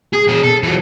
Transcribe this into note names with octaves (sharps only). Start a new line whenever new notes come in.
G#4
B2 G#4
A4
E3 F#3